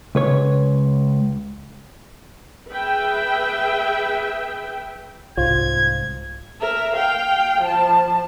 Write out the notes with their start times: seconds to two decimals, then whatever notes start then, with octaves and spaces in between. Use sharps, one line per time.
0.15 C#2 B4 C#5
2.68 G#4 B4 E5 G5
5.37 C2 G#2 F4 C5 G#6
6.61 A#4 E5
6.94 F5 G5
7.61 F3 A5